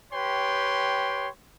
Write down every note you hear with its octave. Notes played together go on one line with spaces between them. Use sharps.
G4 B4 C#5 G5 C6